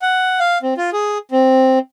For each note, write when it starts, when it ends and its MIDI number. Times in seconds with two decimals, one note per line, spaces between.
0.02 0.39 78
0.39 0.58 77
0.63 0.74 60
0.77 0.90 65
0.93 1.18 68
1.32 1.79 60